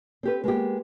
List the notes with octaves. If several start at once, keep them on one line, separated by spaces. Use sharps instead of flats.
C4 G4 B4
G#3 A#3 B3 G4